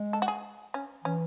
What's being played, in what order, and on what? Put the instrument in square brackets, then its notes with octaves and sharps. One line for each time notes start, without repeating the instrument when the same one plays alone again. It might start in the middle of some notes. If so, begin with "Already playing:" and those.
Already playing: [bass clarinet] G#3
[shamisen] A4
F#4
G#4
C#4
[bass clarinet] E3 [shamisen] C#4